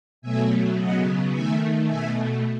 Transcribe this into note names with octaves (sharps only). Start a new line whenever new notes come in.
B2 F#3 A3 E5 G#5
C#3 F#3 B3 D#5 F#5
D#3 A3 E5 G#5
B2 A3 E5 G#5